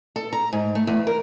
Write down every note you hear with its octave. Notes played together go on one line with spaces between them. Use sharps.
A4
A#5
G#2
A3
E2
A#4